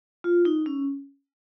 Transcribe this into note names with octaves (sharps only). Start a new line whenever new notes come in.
F4
D#4
C#4